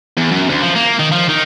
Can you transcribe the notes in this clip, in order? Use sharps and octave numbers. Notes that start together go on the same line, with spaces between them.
E2
F#2
D2
F3
A#3
D#3
F3
D#3